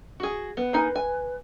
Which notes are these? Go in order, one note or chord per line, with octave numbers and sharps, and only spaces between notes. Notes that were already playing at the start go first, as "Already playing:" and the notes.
F#4 G#4
B3 B4
A#3 D#4 G#5
G#5